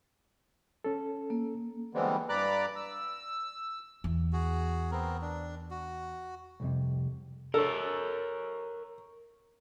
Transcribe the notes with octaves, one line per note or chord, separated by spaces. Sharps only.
C#4 A4
A#3
D3 E3 G3 G#3 B3 C4
G2 D5 A#5 B5 D6 F#6
E6
E2
F#4 G#4
B3 C4 A#4
D4
F#4
C2 F2 C3
A4 A#4 C#5